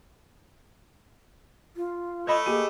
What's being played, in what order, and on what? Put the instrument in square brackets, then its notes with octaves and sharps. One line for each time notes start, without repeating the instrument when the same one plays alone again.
[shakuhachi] F4
[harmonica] A3 [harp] C#5 D#5 B5
[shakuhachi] A#3 [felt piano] G4 G#4 D#7